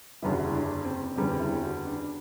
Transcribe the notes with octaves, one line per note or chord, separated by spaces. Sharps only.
F#1 E2 D3 G3 B3 E4
F#4
E4
D4
C4
F#1 E2 D3 G3 B3 C4
C4
E4
F#4
D4